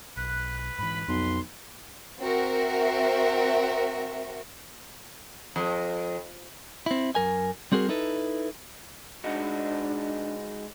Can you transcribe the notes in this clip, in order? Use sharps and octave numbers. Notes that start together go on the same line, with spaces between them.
B1 B4 F#6
G#2 E3 B5
B1 F2 C6
C4 F#4 A#4 E5
F2
C4 E4
F#2 A#4 G#5
G3 C4 F#4 G#4 A#4
D#4 E4 A4 B4
G#3 D4 D#4 F#4